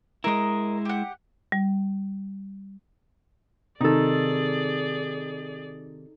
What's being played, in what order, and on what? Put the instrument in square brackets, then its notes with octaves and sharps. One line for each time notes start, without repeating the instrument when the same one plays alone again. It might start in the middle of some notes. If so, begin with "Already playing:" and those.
[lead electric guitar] G#3 E4 [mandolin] A#4 D#5
[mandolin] G4 F#5
[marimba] G3
[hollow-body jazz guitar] C3 D#3 [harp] D#4 A4 [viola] G#4 D5